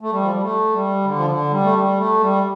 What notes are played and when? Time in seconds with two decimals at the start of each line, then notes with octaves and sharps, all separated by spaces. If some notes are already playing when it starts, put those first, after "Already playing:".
0.01 A3
0.11 G3
0.21 F3
0.31 G3
0.42 A3
0.73 G3
1.04 D3
1.16 F3
1.28 D3
1.50 G3
1.63 A3
1.74 G3
1.97 A3
2.20 G3